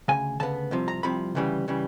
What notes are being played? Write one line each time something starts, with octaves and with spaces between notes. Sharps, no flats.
D2 C#3 G#5
D2 C#3 B3 A5
C2 C3 F3
A#5
C2 C3 F3 B5
D2 C#3 E3 G3
C#3 E3 G3